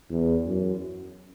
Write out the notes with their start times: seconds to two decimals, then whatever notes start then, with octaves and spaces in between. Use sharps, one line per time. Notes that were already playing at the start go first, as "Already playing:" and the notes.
0.10 E2
0.46 F#2